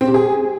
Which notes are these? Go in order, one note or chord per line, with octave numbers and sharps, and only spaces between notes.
C4
G4
G#4